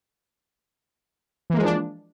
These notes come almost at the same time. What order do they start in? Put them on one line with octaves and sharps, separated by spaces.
E3 A#3 G#3 F3 D4